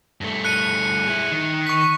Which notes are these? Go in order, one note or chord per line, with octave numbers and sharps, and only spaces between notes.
G2 A3
F#6 C#7 D#7
G#3 E4
D#3
C#6 B6